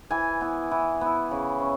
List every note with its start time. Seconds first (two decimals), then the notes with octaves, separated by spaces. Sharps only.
0.11 E3 G#5
0.41 B3 E4
0.71 E3
1.01 B3 E4
1.31 C#3
1.62 C#4